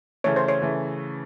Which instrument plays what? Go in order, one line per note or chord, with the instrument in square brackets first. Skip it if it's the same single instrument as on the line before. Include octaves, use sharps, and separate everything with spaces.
[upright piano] C#3 E3 A3 [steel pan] C#5
[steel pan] C5
C#5
[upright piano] C#3 E3 A3